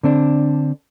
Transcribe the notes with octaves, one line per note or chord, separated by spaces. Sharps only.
D3 C4 D4